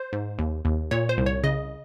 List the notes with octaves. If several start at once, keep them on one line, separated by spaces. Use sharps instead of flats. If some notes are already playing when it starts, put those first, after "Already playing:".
Already playing: C5
G#2
D#2
D#2
A#2 C#5
C5
C2
C#5
C#3 D#5